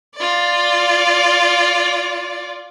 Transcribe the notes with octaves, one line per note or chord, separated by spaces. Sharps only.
F4 D5